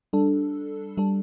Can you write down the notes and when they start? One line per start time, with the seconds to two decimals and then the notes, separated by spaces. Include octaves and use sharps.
0.13 G3 D4 A4
0.97 G3 D4 A4